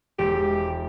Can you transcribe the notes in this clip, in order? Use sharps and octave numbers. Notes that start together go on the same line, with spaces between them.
E1 G4